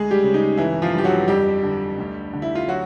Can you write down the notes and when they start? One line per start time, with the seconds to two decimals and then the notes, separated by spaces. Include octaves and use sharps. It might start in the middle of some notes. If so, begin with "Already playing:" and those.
Already playing: D2 G#3 G#4
0.11 G3 G4
0.23 C#3
0.34 D#4
0.57 G1 E3 E4
0.82 F3 F4
0.93 G2 G4
1.04 F#3 F#4
1.28 F2 G3 G4
1.63 D3
1.98 D2
2.33 D3
2.42 E4
2.55 F4
2.68 F#3 F#4